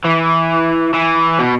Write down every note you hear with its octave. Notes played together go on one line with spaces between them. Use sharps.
E3
E3
B2